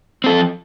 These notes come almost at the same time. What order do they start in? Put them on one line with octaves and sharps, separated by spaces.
C4 A4 F3